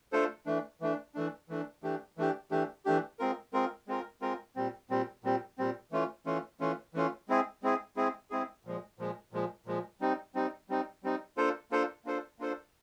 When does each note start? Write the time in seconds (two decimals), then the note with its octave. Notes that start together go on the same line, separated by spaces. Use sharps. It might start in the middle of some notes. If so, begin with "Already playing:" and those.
0.12 A3 D4 F4 A4 C5
0.46 E3 A3 D4
0.81 E3 A3 D4
1.15 E3 A3 D4
1.49 E3 A3 D4
1.83 E3 A3 D4 G4
2.17 E3 A3 D4 G4
2.51 E3 A3 D4 G4
2.85 E3 A3 D4 G4
3.19 G#3 C4 F4 A#4
3.53 G#3 C4 F4 A#4
3.87 G#3 C4 F4 A#4
4.21 G#3 C4 F4 A#4
4.56 A#2 G3 C4
4.90 A#2 G3 C4
5.24 A#2 G3 C4
5.58 A#2 G3 C4
5.91 E3 A3 C#4 F4
6.26 E3 A3 C#4 F4
6.60 E3 A3 C#4 F4
6.94 E3 A3 C#4 F4
7.28 G#3 C4 E4 G#4
7.63 G#3 C4 E4 G#4
7.96 G#3 C4 E4 G#4
8.31 G#3 C4 E4 G#4
8.65 A#2 F3 G#3
8.99 A#2 F3 G#3
9.32 A#2 F3 G#3
9.66 A#2 F3 G#3
10.01 G3 C4 D#4
10.35 G3 C4 D#4
10.69 G3 C4 D#4
11.03 G3 C4 D#4
11.37 A#3 D4 F4 A4 C5
11.71 A#3 D4 F4 A4 C5
12.05 A#3 D4 F4 A4 C5
12.39 A#3 D4 F4 A4 C5